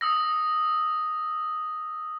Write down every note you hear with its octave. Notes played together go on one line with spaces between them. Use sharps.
D#6 E6 A#6